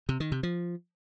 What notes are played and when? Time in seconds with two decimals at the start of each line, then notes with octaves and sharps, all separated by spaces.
0.09 C3
0.20 D#3
0.32 C3
0.43 F3